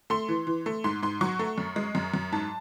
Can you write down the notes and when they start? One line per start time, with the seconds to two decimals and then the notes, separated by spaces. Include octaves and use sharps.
0.10 A3 C6
0.28 E3
0.47 E3
0.66 A3
0.84 G#2 C6
1.03 G#2 C6
1.21 F#3 C#6
1.39 A3
1.58 F#2
1.76 G#3
1.95 F#2
2.14 F#2
2.32 G#2 A5